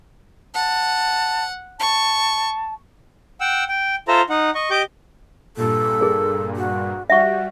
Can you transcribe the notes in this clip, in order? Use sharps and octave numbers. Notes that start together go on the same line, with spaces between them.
F#5 A5
A5 C#6
F#5 G5 E6
G5
F4 A4 C5 E5 A#5
D#4 F#5
D#5 C#6
G4 D#5 D6 G6
G2 A#2 A4
G#4 A#4
F#4
G3 F#4 E5 F#5 C#6